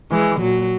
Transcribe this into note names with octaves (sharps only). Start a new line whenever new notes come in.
E3 G#3
A#2 F#3